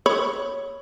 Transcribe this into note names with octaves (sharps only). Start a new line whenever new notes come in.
C#5 B5